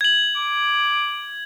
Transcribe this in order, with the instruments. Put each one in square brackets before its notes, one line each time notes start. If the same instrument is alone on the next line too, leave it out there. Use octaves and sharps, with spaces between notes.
[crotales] G#6 F#7
[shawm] D6